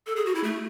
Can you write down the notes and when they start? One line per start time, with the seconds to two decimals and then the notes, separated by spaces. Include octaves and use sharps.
0.07 A4
0.16 G#4
0.26 F#4
0.35 E4
0.44 A3